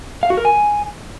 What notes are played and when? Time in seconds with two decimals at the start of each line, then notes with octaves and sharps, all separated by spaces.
0.23 F5
0.30 F#4
0.37 A#4
0.45 G#5